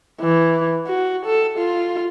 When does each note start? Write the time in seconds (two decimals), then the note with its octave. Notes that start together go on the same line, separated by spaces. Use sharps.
0.21 E3
0.87 F#4
1.26 A4
1.58 F4